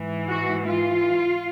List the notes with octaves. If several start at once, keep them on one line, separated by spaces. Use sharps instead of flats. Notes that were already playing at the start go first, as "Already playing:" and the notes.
Already playing: G#2 E3
F#4
F4